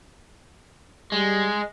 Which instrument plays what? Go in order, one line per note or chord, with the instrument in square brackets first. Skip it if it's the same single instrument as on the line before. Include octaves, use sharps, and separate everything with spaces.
[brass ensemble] G3 [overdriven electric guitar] G#3